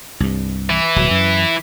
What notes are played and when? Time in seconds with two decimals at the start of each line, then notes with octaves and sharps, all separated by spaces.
0.20 C2 G2
0.70 E3 E4
0.96 D1 B2 F#3
1.11 F#2